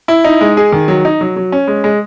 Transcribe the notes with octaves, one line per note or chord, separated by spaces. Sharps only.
E4
D#4
G#3
G#4
D#3
F#3
D#4
F#3
F#3
C#4
G#3
G#3